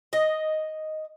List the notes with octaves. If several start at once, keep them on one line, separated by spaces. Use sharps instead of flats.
D#5